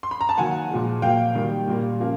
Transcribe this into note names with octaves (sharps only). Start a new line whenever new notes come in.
C6
B5
A#5
A5
D#3 F#3 A#3 F#5 G#5
A#2 F3 G#3
A#2 F#3 A#3 F5 G5
D#3 G3 A#3
A#2 G3 A#3
C#3 F3 A#3